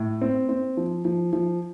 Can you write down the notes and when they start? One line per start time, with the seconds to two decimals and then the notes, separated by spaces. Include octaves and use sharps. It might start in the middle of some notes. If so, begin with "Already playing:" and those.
Already playing: A2
0.22 C4
0.49 C4
0.77 F3
1.05 F3
1.33 F3